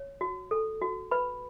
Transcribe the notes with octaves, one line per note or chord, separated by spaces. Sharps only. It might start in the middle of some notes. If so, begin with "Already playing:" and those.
Already playing: C#5
F#4
A4
F#4
B4 B5